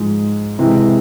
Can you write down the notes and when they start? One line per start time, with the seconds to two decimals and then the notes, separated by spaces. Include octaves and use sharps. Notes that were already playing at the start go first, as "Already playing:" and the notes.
Already playing: G#2 F3 G#3
0.59 C3 E3 G#3